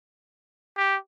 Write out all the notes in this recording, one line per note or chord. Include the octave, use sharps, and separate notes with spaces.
G4